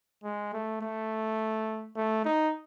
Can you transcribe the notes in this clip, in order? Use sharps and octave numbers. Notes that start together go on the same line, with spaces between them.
G#3
A3
A3
A3
D#4